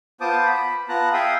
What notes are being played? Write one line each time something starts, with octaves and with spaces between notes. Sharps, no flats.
B3 F4 C5 A5 D6 D#6
B5
B3 F4 A5 A#5 F#6
G#4 E5 F5 G5 D#6